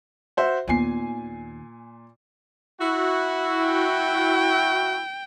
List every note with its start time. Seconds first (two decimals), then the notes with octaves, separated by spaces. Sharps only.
0.37 F#4 C5 E5
0.68 D#2 A#2 B3 G#5 C7
2.79 E4 F#4
3.64 G5